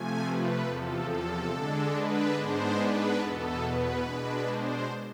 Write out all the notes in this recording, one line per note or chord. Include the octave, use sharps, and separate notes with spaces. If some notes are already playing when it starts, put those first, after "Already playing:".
Already playing: C3 F3 A3 G#5
B4
E2 C3 F3 A4
A4
D3 G#3 D4
B4
G#2 G#3 B3 D4 C5
B4
E2 B2 B3 A4
B4
B2 G#3 D4
C5